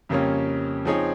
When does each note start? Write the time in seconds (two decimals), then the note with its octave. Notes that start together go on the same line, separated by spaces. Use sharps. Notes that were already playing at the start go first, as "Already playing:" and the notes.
0.09 F2 C#3 G3 A#3 C#4
0.85 F3 C4 D#4 G#4 C#5